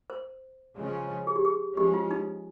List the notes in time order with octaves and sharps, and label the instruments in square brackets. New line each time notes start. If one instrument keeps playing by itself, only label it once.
[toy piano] C5
[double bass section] C#3 F3 G#3 C#4
[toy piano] G#4
G4
G#4
[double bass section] F3 G#3 C#4 [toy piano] G4
[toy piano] F4
D#4